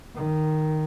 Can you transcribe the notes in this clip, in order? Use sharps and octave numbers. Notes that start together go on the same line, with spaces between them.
D#3